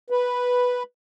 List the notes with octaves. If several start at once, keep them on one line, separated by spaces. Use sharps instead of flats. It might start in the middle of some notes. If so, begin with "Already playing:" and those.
B4